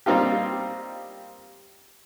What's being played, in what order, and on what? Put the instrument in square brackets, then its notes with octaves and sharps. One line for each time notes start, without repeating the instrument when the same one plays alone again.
[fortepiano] G3 A#3 C4 D#4 F4 G4